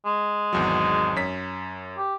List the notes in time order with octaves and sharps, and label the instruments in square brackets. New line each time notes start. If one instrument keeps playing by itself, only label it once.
[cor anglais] G#3
[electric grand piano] G#1 E2 F#3
F#2 C#5 B6
[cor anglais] G4